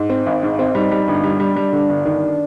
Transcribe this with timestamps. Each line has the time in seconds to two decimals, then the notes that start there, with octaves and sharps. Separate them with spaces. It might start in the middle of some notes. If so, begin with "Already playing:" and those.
Already playing: G#2
0.10 C4
0.26 G#1
0.43 G#2
0.59 C4
0.75 G3 D#4
0.91 G3
1.08 G1
1.23 G3
1.40 G3 D4
1.56 G3
1.73 D3
1.89 G1
2.05 D#3